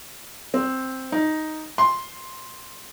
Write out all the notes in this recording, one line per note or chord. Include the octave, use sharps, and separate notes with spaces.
C4
D#4
C6